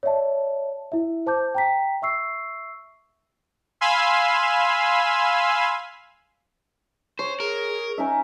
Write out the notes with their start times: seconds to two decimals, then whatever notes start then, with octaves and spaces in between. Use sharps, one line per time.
0.03 C#5 D5 E5 A5
0.92 E4 E5
1.26 C5 A5 D6 G6
1.55 G5 A#5 B6
2.02 E5 C#6 E6 C7
3.81 F5 G#5 B5 C6 E6
7.19 C5 C#5
7.40 G#4 A#4
7.98 C#4 D#4 E5